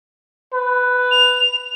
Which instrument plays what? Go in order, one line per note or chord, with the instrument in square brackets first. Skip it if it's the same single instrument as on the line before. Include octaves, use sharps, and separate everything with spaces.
[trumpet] B4
[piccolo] F7